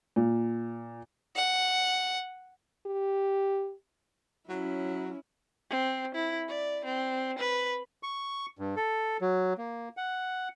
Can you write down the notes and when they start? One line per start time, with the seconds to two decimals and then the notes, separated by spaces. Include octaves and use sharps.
0.16 A#2
1.36 F#5
2.86 G4
4.49 F#3 C#4 E4
5.70 C4
6.15 E4
6.48 D5
6.85 C4
7.38 B4
8.03 C#6
8.59 G2
8.76 A4
9.21 F#3
9.58 A#3
9.97 F#5